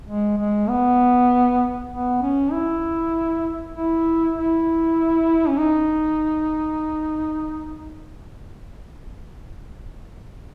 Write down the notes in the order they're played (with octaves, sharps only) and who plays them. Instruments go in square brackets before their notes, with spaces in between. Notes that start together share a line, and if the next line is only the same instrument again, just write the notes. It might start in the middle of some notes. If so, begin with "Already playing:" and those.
[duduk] G#3
G#3
B3
B3
C#4
E4
E4
E4
C#4
D#4